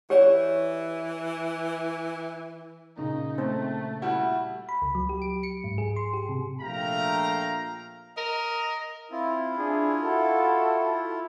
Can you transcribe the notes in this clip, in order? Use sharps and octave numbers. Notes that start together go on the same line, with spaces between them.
E3 G4 C#5 D5
A#2 C#3 A#3 D#4
A3 C4
G3 E4 F#4
B5
C#2
F#3
G4
D7
C#7
G#2
G#4
C6
G4
C3
A#1 A3 F5 G5 A#5
A#4 D#5
C4 E4 F4
D4 G#4
F#4 A4